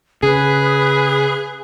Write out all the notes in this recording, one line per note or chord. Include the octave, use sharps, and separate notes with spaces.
C#3 G#4 B4 D#6 F#6